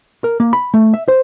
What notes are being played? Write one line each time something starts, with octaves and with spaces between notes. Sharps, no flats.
A#4
A#3
B5
A3
E5
C5